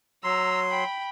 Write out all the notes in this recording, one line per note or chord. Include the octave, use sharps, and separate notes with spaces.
F#3 A#5 C6 E6
G5 B5